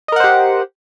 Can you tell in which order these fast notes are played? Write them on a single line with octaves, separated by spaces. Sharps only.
D#5 A#4 F#5 C5 G4